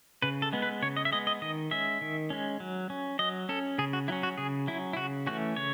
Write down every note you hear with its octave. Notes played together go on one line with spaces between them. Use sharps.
C#3 B4
A4
G#3 B3
B4
C#3 C#5
D#5
E5
G#3 B3 D#5
D#5
D#3 D#5
G#3 C#4 E5
D#3
G#3 C#4
F#3
C#4
F#3 D#5
C#4 A4
C#3 G#4
F#4
F#3 C#4 E4
F#4
C#3 G#4
F#3 C#4 E4
E4
C#3 F#4
E3 A3 C#4 F#4
C#3 C#5